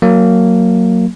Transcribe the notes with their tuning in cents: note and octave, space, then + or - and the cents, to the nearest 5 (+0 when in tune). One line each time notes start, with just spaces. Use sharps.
F#3 +0 A#3 -10